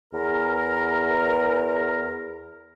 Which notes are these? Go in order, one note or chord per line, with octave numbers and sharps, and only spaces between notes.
E2 A#4